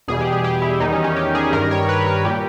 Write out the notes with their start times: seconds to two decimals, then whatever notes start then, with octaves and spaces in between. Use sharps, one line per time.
0.08 E2 B2 G3 G#4
0.20 G4
0.33 G#4
0.44 G4
0.62 E4
0.80 E2 D#3 G3 D#4
0.92 C#4
1.04 C#4
1.16 G4
1.35 G#4
1.53 G2 D#3 G3 A#4
1.71 C#5
1.89 B4
2.07 A#4
2.25 A#2 G3 G4